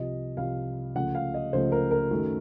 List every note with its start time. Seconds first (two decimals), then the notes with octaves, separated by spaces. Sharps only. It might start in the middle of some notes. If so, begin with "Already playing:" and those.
Already playing: C2 C3 F3 D#5
0.37 C2 C3 F3 F5
0.95 C#2 C#3 F3 A3 F#5
1.15 F5
1.34 D#5
1.53 C#2 C#3 F3 A3 C5
1.72 A#4
1.91 A#4
2.11 F#2 D#3 F#3 A3